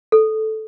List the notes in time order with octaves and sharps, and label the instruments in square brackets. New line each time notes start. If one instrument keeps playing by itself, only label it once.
[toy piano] A4